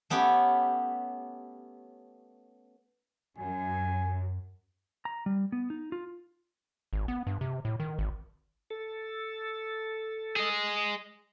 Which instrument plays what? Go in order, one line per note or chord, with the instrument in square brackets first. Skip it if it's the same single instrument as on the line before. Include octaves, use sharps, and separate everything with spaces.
[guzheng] A3 B3 C#4 G4
[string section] F#2 [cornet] G#5
[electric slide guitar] A#5
G3
B3
D#4
F4
[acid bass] G#1
B3
G2
C3
A2
D#3
G#1
[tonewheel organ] A4
[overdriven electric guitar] G#4 D#5